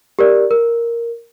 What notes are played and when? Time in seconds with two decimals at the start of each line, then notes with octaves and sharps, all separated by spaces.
0.19 G4 A#4 D5
0.51 A#4